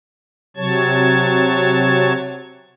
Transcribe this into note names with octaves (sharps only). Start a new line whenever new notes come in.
C3 F#3 C#5 A5 G#6